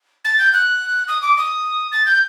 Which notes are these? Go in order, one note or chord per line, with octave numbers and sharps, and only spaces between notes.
A6
G6
F#6
D#6
D6
D#6
A6
G6